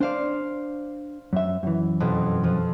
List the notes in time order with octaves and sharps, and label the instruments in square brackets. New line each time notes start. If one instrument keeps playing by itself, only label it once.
[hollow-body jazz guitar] D4 D5 [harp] C5 F5
[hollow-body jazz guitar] F#2 E5
F#2 E3
[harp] F2 B2
F2 F3